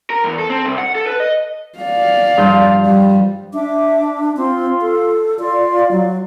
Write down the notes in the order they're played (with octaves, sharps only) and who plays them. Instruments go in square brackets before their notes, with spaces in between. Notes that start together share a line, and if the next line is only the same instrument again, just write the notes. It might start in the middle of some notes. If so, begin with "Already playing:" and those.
[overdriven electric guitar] A#4
E2
A4
C4
C2
F#5
A4
B4
D#5
[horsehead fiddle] D5 F5
[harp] G2 F3 G6
[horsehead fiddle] G3
[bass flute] D4 [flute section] E5 D6
[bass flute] C4 [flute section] F4 C6
[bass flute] A4
[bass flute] F4 [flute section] D5 F5
[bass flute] F#3